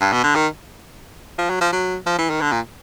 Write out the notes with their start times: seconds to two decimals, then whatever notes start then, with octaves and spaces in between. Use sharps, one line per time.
0.01 G2
0.12 B2
0.24 D3
0.35 D#3
1.39 F3
1.50 F#3
1.61 F3
1.72 F#3
2.06 F3
2.19 E3
2.30 D#3
2.41 D3
2.52 A#2